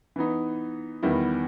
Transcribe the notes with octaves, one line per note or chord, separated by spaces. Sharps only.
E3 B3 D#4
E2 D#3 G3 B3 E4